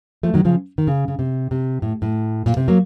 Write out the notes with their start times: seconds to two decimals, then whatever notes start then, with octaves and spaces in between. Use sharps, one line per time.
0.23 F3 A3
0.34 D#3 F#3
0.45 C#3 F3
0.78 D#3
0.87 C#3
1.08 C#3
1.19 C3
1.51 C3
1.82 A2
2.02 A2
2.46 A#2
2.57 C3
2.68 F#3 A#3